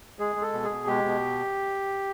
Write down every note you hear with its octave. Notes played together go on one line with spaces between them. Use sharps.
G#3 G#4
G#3
A4
B2
G#4
B2
G#3 G4
B2